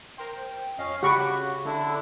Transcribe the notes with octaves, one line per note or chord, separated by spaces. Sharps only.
A#4 C5 G5
F2 C#4 D#5 F5
C#3 F#4 G4 F#5 B5 C#6 D6
D3 D4 E4 A4